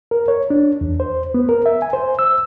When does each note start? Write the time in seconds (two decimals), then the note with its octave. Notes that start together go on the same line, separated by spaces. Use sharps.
0.11 A#4
0.28 C#5
0.50 D4
0.81 E2
1.00 C5
1.34 B3
1.49 A#4
1.66 E5
1.82 G#5
1.93 C5
2.19 E6